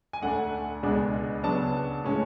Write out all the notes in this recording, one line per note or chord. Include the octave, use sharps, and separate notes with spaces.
G#5
D2 D3 A3 D4 F#5
C#2 B2 G#3 D4
C#3 F#3 B3 D4 A5
A2 G#3 C#4